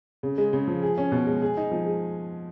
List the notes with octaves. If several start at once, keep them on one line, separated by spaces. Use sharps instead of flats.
C#3
G#3
C#3
F3
G#4
C#4
B2
G#3
G#4
D#4
F3
G#3